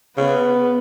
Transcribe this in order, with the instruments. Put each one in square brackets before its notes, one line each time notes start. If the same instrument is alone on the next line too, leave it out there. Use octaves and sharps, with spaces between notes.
[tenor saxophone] C#3 [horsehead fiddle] B3